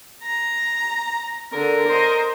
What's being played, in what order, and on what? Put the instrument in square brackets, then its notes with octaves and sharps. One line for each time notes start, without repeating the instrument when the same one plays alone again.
[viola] A#5
[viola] D3 [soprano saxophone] A#4
[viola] C5 D#5